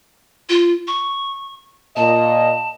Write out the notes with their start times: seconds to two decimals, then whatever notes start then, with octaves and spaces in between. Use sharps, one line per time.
0.49 F4
0.88 C#6
1.96 A#2 D#5 A5